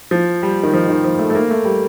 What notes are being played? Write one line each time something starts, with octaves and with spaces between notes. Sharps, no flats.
F3
G3
D#3
F3
D#3
F3
A3
A3
A#3
A3
G3